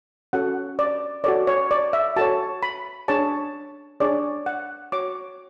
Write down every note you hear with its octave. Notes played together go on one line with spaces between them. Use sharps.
C#4 F#4 A4 F#5
D5
F#4 A4 C#5 D5
C#5
D5
E5
F#4 A4 C#5 A5
B5
D4 G#4 C#5 A5
D4 G#4 C#5 D5
F#5
F#4 C#5 D6